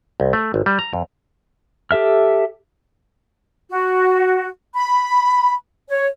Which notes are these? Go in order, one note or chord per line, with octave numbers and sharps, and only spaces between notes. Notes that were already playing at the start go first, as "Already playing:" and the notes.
C2
A3
G#1
G3
A#5
F2
G4 A4 E5 F6
F#4
B5
C#5